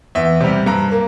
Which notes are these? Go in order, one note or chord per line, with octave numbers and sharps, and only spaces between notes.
E2 E5
C3 G3
G2 A#5
A#3